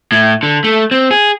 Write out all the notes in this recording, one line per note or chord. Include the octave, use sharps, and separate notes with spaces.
A2
D3
A3
C4
G#4